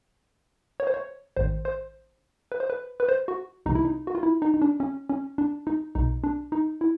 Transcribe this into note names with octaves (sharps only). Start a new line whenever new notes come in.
C#5
C5
C#5
A1 G#2 D#3 C5
C5
B4
C5
B4
B4
C5
F#4
C2 C3 E3 D#4
E4
D#4
F#4
F4
E4
D#4
D#4
D4
C#4
C#4
D4
D#4
B1 B2 D#4
D4
D#4
E4